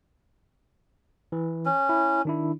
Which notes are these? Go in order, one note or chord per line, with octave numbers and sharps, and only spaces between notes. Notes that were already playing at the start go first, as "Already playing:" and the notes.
E3
C#4
E4
D#3 D4 E4